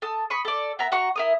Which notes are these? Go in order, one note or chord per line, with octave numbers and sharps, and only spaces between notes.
A4 A5 D#6
B5 C#6 D#6
A4 D5
B3 A#4 E5 A#5
F#4 A#5 C#6
E4 A#4 D#6